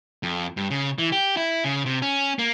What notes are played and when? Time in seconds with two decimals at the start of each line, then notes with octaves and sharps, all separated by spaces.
0.23 F2
0.57 G2
0.70 C#3
0.98 E3
1.12 G4
1.37 E4
1.64 C#3
1.86 C3
2.02 C#4
2.39 A#3